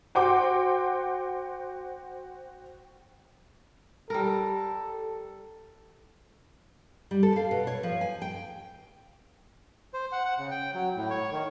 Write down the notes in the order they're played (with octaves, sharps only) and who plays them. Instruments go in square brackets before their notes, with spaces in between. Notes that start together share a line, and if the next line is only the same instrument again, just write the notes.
[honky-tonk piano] F#4 C5 G5 C6 D6
[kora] G3 A#4 [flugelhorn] A4
[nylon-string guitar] G3
A4
F5
B2
C#5
F3
G#5
G5
[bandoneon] C5
F#5
F#5
C#3
G5
F#3
A2
C#5
D#3